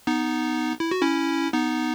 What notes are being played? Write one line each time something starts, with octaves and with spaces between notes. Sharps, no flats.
B3 D#4
E4
F#4
C#4 E4
B3 D#4